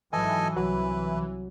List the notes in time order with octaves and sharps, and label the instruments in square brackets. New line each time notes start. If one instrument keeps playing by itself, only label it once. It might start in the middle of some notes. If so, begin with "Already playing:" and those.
[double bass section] G#1 F#3 [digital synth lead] E3 [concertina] A4 D#5 G#5
[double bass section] C2 [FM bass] F#3 [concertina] B4